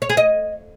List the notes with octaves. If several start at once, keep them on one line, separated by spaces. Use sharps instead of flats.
C#5
G#4
D#5